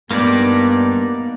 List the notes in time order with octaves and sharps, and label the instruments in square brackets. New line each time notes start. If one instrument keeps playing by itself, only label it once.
[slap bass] G2 [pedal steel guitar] A#3 D#4 D5 [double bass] B3